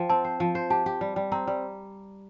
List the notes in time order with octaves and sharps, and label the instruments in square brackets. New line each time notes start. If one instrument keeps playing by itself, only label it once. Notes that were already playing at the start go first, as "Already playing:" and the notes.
Already playing: [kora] F3 [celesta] G5
[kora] C4 [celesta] A5
[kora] C5
F3
C5
[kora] G4 [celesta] A5
[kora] G4
G3
G3
[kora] C4 [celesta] A#5
[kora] G3